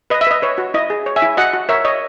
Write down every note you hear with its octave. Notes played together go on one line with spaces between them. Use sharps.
B4 D#5
E5
B4 D#5
B4 C#5
F#4
E4 D#5
G#4
C#5
E5 G#5
E4
F#4 D#5 F#5
F#4
A#4 C#5 E5
C#5 D#5